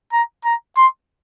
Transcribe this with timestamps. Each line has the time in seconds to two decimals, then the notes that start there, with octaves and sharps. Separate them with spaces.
0.13 A#5
0.45 A#5
0.77 C6